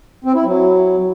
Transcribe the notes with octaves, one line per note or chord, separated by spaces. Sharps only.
C4
E4
F#3